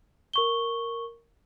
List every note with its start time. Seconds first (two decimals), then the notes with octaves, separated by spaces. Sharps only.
0.33 A#4 C#6 G7